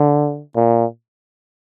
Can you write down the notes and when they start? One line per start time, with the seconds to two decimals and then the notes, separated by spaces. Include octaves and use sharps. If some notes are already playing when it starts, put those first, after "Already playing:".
Already playing: D3
0.55 A#2